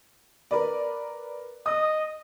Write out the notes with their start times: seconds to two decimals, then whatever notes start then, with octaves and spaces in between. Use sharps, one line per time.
0.51 A#4 B4 D5
1.66 D#5 D#6